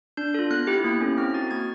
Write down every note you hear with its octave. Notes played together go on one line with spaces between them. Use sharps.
D4 G6
F4 A4
B3 F#6
E4 G4
A#3
C#4 E4 A4
C4 F6
D#4 F#4 A6
A#3 G#6